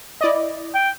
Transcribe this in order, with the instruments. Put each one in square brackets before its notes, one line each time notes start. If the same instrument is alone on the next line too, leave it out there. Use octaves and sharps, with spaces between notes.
[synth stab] E4 D5 D#5
[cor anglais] G5